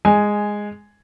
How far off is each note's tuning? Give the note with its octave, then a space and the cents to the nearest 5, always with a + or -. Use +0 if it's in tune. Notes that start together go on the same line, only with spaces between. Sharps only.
G#3 -5 G#5 +0